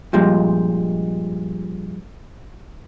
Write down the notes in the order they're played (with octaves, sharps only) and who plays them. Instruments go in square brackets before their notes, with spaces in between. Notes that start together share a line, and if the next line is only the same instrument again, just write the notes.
[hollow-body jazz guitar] G2 A#2 F3 G3 G#3